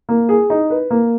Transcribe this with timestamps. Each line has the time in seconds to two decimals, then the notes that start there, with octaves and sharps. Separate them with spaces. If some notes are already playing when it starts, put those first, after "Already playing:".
0.09 A#3
0.29 G#4
0.50 D#4
0.70 B4
0.90 A#3